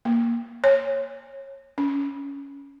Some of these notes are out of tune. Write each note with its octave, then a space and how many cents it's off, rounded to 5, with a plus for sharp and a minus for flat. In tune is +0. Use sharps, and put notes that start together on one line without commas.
A#3 +5
C#5 -25
C#4 +15